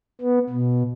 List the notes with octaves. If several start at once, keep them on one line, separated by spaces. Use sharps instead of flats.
B3
B2